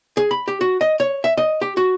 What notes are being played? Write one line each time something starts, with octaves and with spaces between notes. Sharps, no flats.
G#4
B5
G4
F#4
D#5
C#5
E5
D#5
G4
F#4